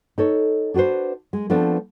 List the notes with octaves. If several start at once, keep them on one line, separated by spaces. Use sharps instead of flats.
D#4 A4 C#5
D4 F#4 G#4 B4 C5
G#3
F3 A3 B3 C4 D4